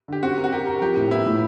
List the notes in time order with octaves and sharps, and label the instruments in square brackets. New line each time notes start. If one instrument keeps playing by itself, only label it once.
[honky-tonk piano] D3 [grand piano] G4
[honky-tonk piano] C4 [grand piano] F#4
[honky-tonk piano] A#4
[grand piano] F#4
[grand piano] G4 [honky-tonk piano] A#4
[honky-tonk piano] A#4
[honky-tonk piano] F3 [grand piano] G4
[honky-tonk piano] A2
[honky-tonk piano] B3 [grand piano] E4
[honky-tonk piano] A2